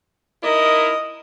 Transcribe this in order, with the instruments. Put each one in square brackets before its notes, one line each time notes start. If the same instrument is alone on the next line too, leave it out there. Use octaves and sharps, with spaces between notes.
[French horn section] D#4 E4 A#4 [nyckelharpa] D#5